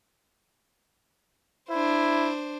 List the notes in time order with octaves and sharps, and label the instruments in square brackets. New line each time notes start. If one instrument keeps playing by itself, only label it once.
[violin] D4 C5 [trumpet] E4